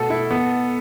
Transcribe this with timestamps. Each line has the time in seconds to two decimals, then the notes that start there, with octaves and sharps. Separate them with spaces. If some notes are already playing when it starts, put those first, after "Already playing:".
Already playing: B2 A3 A4
0.10 E4
0.31 B3